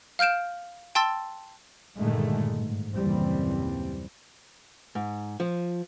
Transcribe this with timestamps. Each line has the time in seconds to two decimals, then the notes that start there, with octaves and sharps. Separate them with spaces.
0.19 F5 F6 G6 D7 E7
0.95 G5 A5 C6 E6 A6
1.97 G2 A#2 D3 D#3 G#3 A3
2.58 G#2
2.94 F#1 D#2 A#2 E3 G3 C4
4.95 G#2
5.40 F3